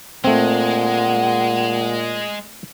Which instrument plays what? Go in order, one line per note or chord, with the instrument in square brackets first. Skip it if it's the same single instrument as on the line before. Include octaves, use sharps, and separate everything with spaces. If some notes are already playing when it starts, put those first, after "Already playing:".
[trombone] A#2 [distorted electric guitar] G#3 [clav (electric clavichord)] A3 C4 [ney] F#5